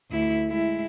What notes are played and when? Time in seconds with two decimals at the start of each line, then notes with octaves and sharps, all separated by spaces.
0.11 D2 E4
0.49 G#3 E4